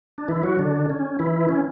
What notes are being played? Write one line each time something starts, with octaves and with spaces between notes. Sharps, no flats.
D4
E3 E4
F#3 F#4
D3 D4
C#4
E3 E4
C#4